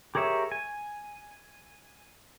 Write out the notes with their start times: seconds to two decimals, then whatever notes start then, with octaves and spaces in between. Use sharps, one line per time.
0.15 G4 G#4 A#4 C#5 E5
0.52 G#5